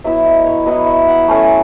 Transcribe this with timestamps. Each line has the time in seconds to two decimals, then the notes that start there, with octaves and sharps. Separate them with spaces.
0.04 F#3 B3 E4 E5
0.25 D#5
0.46 C#5
0.66 F#3 B3 E4 D#5
0.78 D#5
0.86 E5
1.08 F#5
1.27 F#3 A3 C#4 G#5